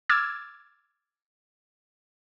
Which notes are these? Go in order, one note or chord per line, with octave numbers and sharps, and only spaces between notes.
D6 E6 F6 G#6 A6